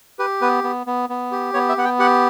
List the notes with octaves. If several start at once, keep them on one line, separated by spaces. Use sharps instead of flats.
G4 B4
B3 B4
B3
B3
B3
G4
B3 C#5
E5
B3 F#5
G5
G4 F#5